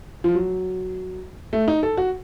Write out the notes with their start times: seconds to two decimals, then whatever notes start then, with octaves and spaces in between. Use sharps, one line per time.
0.24 F3
0.35 F#3
1.53 A3
1.68 D#4
1.83 A4
1.97 F#4